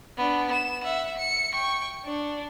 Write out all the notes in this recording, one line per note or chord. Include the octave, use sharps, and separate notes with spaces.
B3 D4
E7
E5 F#5
C#7
G5 C#6
D4